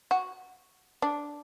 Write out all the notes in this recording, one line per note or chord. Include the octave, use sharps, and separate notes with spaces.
F#4
D4